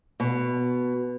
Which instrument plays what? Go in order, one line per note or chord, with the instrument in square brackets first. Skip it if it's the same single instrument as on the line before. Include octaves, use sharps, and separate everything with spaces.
[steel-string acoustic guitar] B2